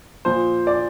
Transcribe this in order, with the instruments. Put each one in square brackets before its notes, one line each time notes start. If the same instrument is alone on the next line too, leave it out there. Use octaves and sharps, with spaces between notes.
[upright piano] A#2 F3 C5
D5